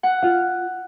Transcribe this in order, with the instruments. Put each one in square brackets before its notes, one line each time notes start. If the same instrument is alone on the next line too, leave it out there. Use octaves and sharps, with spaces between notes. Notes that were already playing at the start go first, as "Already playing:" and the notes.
[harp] F#5
[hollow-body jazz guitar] F4 F5